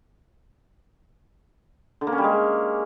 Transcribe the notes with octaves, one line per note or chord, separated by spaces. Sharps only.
D3
A#3
C#4
G3
G#3